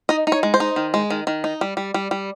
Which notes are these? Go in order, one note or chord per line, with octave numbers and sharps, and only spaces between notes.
D#4 D#5
D#4
C#5
G#3
C5
D#4
D#3
G#3
D#3
D#3
D#4
G3
G3
G3
G3